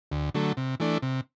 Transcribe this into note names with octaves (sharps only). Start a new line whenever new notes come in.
D2
D3 F#3 A3
C3
E3 A3 D4
C3